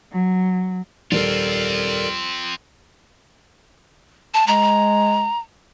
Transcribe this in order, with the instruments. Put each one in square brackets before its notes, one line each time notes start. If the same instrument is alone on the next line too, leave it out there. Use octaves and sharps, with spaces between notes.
[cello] F#3
[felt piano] D#1 [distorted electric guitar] C4 F4 [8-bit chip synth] A4 A#4 D5
[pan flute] A5
[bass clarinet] G#3 [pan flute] A#5